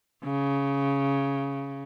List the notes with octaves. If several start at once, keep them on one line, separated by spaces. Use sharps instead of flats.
C#3